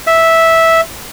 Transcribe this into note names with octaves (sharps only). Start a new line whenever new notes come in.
E5